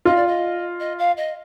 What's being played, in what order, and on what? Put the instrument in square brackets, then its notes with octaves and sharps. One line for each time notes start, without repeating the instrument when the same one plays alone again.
[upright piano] F4 [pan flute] D#5
[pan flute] D5
D#5
D#5
F5
D#5